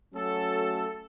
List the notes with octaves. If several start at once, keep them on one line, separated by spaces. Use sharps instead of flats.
F#3 A3 C#4 F#4 A4